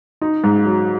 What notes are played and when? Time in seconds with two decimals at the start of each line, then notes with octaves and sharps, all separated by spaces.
0.21 D#4
0.44 G#2
0.65 F#3